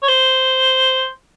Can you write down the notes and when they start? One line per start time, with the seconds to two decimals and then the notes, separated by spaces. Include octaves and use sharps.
0.03 C#5
0.08 C5